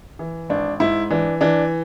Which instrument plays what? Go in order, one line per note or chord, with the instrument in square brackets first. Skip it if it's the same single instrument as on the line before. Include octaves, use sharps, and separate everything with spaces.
[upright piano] E3
G#1 D4
G#2 E4
E3 D4
E3 D4